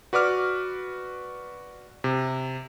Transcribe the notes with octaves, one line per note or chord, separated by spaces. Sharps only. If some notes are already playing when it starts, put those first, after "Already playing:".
F#4 B4 D5 D6 F6
C3